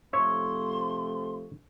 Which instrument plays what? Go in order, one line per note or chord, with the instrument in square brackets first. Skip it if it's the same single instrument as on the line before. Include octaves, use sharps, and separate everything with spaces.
[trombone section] C3 F3 A3 [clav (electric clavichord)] C#5 E5 [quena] C6